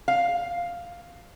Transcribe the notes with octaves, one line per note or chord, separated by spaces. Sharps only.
F5